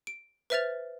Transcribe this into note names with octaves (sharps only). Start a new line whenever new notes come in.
D7
B4 C5 E5 F6 A6 F7